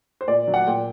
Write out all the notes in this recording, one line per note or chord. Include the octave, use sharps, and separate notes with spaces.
C5
A#2 D5
F#3
F#5
A#2 G5